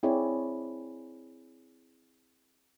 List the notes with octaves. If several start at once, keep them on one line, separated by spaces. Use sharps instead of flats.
C4 E4 G#4 C#5 D5